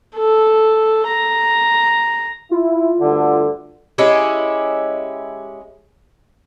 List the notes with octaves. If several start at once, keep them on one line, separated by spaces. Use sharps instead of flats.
A4
A#5
E4 F4
D2 G2 D3
G#3 C#4 E4 G4